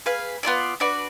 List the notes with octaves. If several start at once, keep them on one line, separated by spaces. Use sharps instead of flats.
G#4 B4 F5
B3 F4 A4 D5
D4 F#4 B4 D5